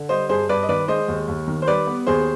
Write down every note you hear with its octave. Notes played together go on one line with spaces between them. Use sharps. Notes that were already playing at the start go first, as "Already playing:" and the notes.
Already playing: D3
G3 C5 D#5
G2 G#4 C5
G2 B4 D5
D#5
D#3 B4 D5
G#3 C5 D#5
D#2
D#2
D#3
C5
G3 B4 D5
B3
D#2 G#4 C5